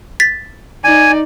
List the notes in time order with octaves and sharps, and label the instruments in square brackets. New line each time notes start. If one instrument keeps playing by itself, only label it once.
[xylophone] A6 B6
[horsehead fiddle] D#4 D5 [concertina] G#5